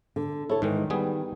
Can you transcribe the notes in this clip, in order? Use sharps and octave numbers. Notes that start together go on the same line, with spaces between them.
D3
E4 A4 C#5
G#2 D#3 E3 G#3
G3 B3 G#4